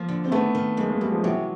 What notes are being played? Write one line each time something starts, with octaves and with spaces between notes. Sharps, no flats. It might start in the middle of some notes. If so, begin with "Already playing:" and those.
Already playing: F3 A#3
D3
C4
D#3 A3 B3
D#3
F#2 G#3 A#3
G#3 A#3
F#2 G3 A3
F3 G3
C3 E3 F#3